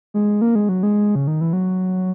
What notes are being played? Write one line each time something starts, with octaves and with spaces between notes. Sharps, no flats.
G#3
A#3
G#3
F#3
G#3
C#3
D#3
E3
F#3